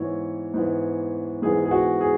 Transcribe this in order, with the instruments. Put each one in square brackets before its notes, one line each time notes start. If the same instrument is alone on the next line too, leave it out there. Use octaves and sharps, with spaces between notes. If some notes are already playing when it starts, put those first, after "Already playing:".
Already playing: [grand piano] G#2 E3 B3 C#5
G#2 E3 B3
G#2 E3 B3 G#4
G#4
F#4
G#4